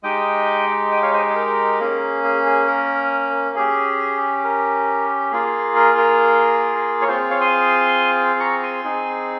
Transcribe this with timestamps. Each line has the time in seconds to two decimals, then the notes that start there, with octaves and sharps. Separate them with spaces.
0.03 G#3 D#4 G4 D#5 G5
0.91 D#5 G5
1.02 C#5 F5
1.13 C5 D#5
1.30 G#4
1.35 A#4
1.80 A#3 C#4 G#4
2.24 G#4
2.46 G#4
2.68 A#4
3.56 C#4 G4 G#4
4.44 A#4
5.32 A#3 F4 G#4
5.76 A#4
5.98 A#4
7.02 C#5
7.08 C4 F4 G#4 C5
7.30 C#5 F5
7.41 C6 D#6
8.40 A#5 C#6
8.63 G#5 C6
8.84 C4 D#4 G#4